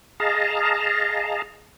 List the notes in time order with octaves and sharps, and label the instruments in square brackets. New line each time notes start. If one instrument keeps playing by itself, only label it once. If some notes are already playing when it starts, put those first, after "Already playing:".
[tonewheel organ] G#4 D#5 F5 A5 A#5